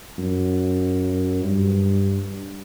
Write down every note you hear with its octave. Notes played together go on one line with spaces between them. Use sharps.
F#2
G2